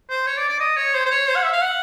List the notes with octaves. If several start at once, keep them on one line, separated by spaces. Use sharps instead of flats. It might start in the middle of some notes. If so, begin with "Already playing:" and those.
C5
C#5
D5
D5
D#5
C#5
C5
C5
C#5
C5
F#5
E5
F5
F#5